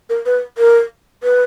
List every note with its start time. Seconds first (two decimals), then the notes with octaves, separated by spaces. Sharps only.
0.10 A#4
0.26 B4
0.58 A#4
1.23 B4